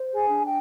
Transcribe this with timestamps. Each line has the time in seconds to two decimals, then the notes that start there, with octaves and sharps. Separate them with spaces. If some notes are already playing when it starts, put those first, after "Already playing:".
Already playing: C5
0.13 G#4 G#5
0.29 D4
0.45 G5